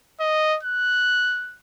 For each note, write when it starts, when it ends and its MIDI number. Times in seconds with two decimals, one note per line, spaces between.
0.20 0.58 75
0.63 1.57 90